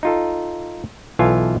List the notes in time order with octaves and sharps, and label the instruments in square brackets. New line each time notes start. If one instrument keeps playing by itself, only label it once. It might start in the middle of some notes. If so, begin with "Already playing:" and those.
[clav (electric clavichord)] D#4 F4 A4
B1 E3 F4 A4 F5 G#5